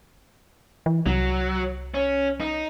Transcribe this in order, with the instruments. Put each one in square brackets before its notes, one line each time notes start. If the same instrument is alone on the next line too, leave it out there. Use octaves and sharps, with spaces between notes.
[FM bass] E3
[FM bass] C2 [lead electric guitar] F#3
[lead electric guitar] C#4
D#4